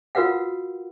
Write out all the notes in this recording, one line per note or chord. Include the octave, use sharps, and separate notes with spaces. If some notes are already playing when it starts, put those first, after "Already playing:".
F4 F#4 A#4 B4 F5 F#5